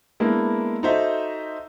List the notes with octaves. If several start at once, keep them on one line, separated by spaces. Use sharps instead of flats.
G#3 A#3 B3 D4 E4
D#4 F#4 A4 C5 D#5 E5